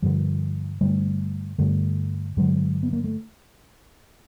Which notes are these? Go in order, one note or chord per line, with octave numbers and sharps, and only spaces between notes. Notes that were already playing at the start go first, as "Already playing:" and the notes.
G2 D3 F3 G3
G2 D3 G3 A3
G2 D3 G3 A3
G2 D3 F#3 G#3
B3
A#3
A3